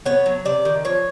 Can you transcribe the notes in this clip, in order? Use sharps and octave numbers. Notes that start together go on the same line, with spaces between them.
B3 C#5
F#3
C3 D5
D#3
F3 C#5